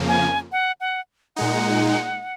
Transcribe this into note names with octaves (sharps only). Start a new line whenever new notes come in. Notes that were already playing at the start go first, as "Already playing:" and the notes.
Already playing: F2 C#3 F3 A#3
G#5
F#5
F#5
A#2 G#3 D#4 F#5